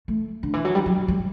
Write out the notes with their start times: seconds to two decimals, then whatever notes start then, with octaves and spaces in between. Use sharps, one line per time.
0.08 A3
0.43 D3
0.53 E3
0.65 F#3
0.75 G3
0.86 F#3
1.08 G3